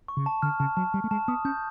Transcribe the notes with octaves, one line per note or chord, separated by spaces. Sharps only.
C#6
C#3
A5
D3 F6
C#3 A5
F#3 A5
G3 A5
A3
G#3 A5
B3 D#6
C#4 G6